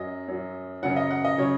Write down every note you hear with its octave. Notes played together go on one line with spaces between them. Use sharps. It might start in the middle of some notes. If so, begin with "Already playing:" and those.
Already playing: F#2 F#3 D#5
F#2 F#3
F#2 C#3 F#3 F#5
D#5
F#5
D#5
C#3 F#3 C#5